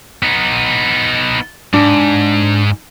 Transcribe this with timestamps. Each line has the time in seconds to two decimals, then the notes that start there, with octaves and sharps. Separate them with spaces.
0.23 B3 D#4
1.74 G#2 D4